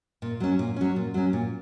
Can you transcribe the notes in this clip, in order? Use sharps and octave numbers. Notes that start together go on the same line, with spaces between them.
A#2
F#3 C#4
A#2
F#3 C#4
A#2
F#3 C#4
A#2